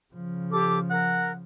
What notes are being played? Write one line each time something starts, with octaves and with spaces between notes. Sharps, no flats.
C#3 F3
G4 A4 D6
A#4 F#5